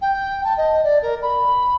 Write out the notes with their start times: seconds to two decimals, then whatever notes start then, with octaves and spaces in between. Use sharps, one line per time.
0.01 G5
0.44 A5
0.57 D#5
0.84 D5
1.02 A#4
1.22 B5